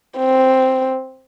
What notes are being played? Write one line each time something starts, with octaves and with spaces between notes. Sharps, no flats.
C4